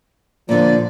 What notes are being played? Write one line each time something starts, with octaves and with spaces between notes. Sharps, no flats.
A#2 D3 F3 D5